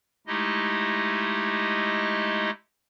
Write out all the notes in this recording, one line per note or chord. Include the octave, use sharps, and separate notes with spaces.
G#3 A3 D#4 E4 G4 D#5